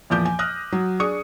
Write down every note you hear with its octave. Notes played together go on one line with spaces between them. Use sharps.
E2 A#2 F3 D6 G6
G#5
D#6 F6 F#6 A#6
F#3
D4 G#4 C#6 D#6 C#7